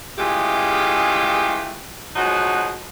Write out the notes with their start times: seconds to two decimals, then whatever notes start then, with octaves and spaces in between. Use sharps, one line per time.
0.18 C#3 E3 G#3 A3 F4 G4
2.16 F3 F#3 G#3 D#4 F#4